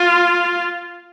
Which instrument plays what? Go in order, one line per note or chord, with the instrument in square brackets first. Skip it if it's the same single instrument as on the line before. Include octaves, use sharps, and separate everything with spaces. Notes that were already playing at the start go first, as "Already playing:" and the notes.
Already playing: [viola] F4